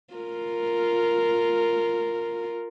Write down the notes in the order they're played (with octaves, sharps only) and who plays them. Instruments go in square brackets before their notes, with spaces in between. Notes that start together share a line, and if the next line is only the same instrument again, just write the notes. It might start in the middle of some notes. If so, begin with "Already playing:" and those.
[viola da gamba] F4 A#4